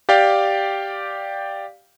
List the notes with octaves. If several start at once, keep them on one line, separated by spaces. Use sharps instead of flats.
G4 D5 F5 G5